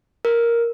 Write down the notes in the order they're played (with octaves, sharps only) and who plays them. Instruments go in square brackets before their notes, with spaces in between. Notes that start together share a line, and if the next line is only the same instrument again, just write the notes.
[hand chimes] A#4